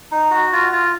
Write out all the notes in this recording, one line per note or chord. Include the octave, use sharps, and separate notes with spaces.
D#4
F#4
F4
F4